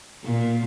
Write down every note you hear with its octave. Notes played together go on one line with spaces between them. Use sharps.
A#2